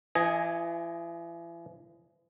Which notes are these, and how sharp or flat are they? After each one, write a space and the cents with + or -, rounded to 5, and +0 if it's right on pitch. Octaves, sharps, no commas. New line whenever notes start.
E3 +40 D#5 +5 G#5 +0